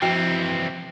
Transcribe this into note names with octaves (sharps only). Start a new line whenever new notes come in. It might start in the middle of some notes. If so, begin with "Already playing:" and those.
E3 F3 C4 F#4 G5